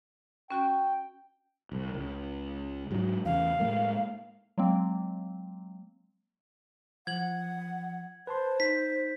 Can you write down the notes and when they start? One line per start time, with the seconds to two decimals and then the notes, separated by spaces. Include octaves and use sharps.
0.51 C#4 F#4 G5 C#6
1.72 C2
1.94 C#2
2.91 G#2 F#3
3.25 E2 C#3 F5
3.60 A2 G#3 A#3
4.58 F#3 G#3 A#3 C4
7.07 F3 F#5 G#6 F#7
8.27 B4 C5 A5 C6
8.60 D#4 B6